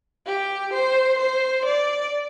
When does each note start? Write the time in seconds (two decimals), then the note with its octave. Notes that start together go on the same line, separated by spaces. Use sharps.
0.26 G4
0.73 C5
1.19 C5
1.65 D5